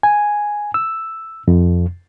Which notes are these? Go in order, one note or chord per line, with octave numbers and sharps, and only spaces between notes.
G#5
E6
F2